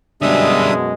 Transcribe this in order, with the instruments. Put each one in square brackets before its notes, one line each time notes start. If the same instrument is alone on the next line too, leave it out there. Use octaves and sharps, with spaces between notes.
[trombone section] F#2 B2 G#3 [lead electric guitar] D3 G3 [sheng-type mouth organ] D4 E5 D#6